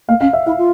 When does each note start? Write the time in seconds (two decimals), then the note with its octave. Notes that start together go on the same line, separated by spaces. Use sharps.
0.08 A#3 F5
0.21 C#4 F5
0.33 E5
0.46 E4 F5
0.58 F4